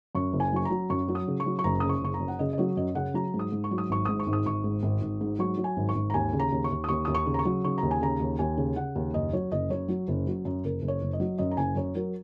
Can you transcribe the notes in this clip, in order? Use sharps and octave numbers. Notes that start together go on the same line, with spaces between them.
F#2 C#6
F#1
G#5
F#3 C#6
A#5
F#3
F#2 C#6
F#3
D#6
C#3
C#6
F#3
C#6
F#1 A#5
C#3 D#6
C#6
F#1 C#6
A#5
F#2
F#5
C#3 D#5
D#5
F#3 C#5
F#2 D#5
C#3 F#5
F#3 A#5
G#2
D#6
G#2
C#6
F#3
D#6
G#1 C#6
G#2 D#6
C#6
G#1
D#6
G#1 C#6
G#2
G#1
G#1
G#2
F#3 C#6
F#3
G#5
G#1
C#6
G#1
A#5
D#2 G#5
C#3
A#5
D#2
C#6
D#2
D#6
D#2 C#6
D#2 D#6
C#6
C#3
A#5
C#6
F#3
C#3 C#6
D#2 A#5
G#5
C#3 A#5
D#2
D#2 G#5
C#3
C#3 F#5
D#2
F#1 D#5
F#3 C#5
F#1 D#5
F#2 C#5
F#3
F#1
F#3
F#2
F#1 A#4
F#1
C#5
F#1
D#5
F#3
F#2 D#5
A#5
F#1 G#5
F#2 C#5
F#3 A#4